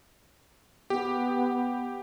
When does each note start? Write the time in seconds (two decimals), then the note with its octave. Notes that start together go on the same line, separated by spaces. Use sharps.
0.90 B3 G4